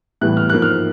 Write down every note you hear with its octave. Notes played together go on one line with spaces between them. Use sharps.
A2 E3 G3 B3 F#6
F6
G#2 F3 A#3 F#6
F6